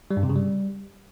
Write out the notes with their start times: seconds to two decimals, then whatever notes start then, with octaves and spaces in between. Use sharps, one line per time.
0.11 G3
0.17 G2
0.23 C3
0.29 C#3
0.36 G3